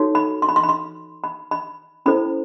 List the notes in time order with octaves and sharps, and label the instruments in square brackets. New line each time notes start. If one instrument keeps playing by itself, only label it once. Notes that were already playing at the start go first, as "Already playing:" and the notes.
Already playing: [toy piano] D#4 F#4 A4 C#5
B5
C6
B5
C6
B5
C6
B5
B5
C#4 E4 A4 C5 B5